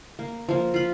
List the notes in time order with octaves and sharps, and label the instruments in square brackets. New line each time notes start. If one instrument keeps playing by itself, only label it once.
[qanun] A#3
F3 A#3
F4 B5